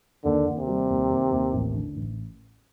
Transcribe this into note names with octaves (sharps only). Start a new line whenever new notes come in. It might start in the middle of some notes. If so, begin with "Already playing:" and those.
D#2 D3
D#2
C3
G3
D#2
D#2
D#2
A1
D3
A1